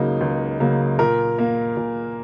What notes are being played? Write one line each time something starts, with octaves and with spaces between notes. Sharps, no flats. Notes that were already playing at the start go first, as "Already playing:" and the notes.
Already playing: C#2 C#3 F#3 A#3 D#4
C#2
C#3 F#3 A#3
A#2 A#4
A#3
A#2